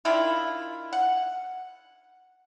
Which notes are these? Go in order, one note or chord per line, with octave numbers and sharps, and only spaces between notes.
D#3 D4 E4 F4
F#5